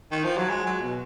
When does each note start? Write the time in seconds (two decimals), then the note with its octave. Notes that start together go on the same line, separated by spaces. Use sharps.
0.11 D#3
0.24 F3
0.37 F#3
0.49 G#3
0.66 F#3
0.82 B2